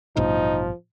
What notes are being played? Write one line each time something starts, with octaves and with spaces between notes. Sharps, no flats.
A1 G2 B2 F3 D#4